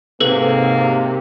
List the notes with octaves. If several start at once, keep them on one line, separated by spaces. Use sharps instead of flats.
G#2 C3 A#3 A4 B4 F#7